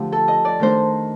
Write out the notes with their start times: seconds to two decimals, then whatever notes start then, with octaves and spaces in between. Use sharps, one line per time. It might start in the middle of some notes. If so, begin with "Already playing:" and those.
Already playing: D3 F3 A3 C4 G4
0.12 A4
0.28 D#5
0.45 D5
0.60 D#3 A3 D4 C5